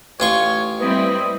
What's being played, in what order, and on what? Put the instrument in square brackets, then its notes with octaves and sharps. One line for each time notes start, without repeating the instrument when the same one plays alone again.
[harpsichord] A1 F4 C#6 [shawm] C#5
[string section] G3 C4 E4 [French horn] B4 [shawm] D#5